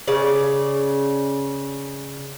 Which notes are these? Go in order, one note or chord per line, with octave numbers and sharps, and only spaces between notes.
C#3 D5